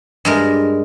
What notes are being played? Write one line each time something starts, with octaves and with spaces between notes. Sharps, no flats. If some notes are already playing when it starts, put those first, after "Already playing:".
G2 G#3 A#4